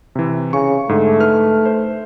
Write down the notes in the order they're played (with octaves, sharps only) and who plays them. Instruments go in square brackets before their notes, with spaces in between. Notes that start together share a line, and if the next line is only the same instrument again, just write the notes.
[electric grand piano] C3 E3
[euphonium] C#3 [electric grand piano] C#6
[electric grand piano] G#2 D3 [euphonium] A3
[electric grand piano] D#4 B4 F6
C5